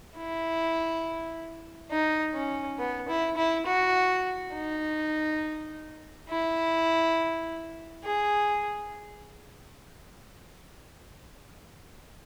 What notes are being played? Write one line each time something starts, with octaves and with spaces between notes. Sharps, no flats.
E4
D#4
C#4
B3
E4
E4
F#4
D#4
E4
G#4